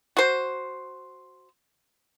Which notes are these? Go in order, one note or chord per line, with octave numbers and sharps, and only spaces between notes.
F#4 C5